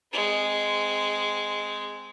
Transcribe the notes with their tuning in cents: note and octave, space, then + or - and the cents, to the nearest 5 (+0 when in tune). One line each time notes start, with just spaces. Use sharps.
G#3 +0 C4 -20